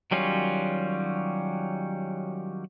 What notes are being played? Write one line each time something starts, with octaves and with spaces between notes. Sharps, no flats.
D#3 F#3 G3 C#4 F4